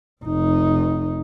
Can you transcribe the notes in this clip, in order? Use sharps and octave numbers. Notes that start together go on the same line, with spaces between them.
F1 D#4